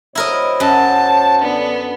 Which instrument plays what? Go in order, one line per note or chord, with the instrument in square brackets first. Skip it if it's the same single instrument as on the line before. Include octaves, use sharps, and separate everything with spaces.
[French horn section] B2 C5 C#5 [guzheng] E4 A#4 D#5
[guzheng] F#2 [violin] A5
[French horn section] D3 D4 [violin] B3